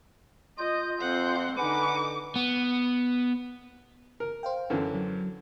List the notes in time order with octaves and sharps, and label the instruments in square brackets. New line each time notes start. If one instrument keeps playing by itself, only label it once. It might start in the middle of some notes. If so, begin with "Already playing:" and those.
[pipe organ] F4 G6 [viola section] D#5
[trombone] F2 [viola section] C4 C6 [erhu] F#5
[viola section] D3 D#4 [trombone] B4 [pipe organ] F#5 G#5 [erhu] D6
[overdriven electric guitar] B3
[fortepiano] A#4
[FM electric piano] C5 F5 G5
[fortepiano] F#2 D3 E3
[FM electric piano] F#3